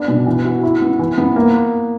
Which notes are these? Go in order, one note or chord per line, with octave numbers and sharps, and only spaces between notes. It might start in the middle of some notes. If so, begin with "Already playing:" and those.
Already playing: B3 D4
B2
E3
F#4
E4
B3
E3
B3
A#3